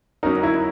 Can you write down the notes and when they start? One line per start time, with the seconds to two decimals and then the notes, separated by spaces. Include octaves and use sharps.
0.23 F#3 C#4 D#4 F#4 A#4
0.43 E4